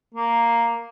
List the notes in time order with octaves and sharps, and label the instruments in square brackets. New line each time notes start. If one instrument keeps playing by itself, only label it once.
[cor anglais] A#3